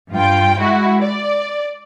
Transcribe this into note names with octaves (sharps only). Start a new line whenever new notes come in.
G2 F4 G5
G#3 E4 F#4
D5